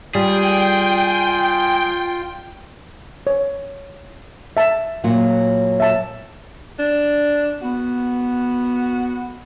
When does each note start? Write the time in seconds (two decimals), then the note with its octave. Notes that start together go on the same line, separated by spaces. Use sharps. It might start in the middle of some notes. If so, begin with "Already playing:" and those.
0.15 G3 F4 G#4 G5
3.27 C#5
4.57 E5 A5
5.04 A#2 F#3 F4
5.80 E5 A5
6.79 D4
7.62 B3 F#4